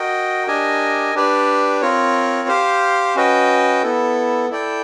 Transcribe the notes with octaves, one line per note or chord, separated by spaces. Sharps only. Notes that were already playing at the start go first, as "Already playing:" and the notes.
Already playing: F#4 A#4 D#5 G5
D4 G4 A#4 D#5 G#5
D4 G4 B4 D5
C4 F4 A#4 C#5
G4 C5 F5
C#4 F#4 B4 D#5 G5
B3 E4 A4
E4 A4 D5 G5